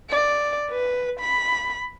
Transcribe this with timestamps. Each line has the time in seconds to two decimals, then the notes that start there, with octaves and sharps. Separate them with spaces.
0.11 D5
0.71 B4
1.20 B5